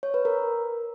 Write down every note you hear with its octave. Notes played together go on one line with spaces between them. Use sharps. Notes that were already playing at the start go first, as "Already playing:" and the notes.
C#5
B4
A#4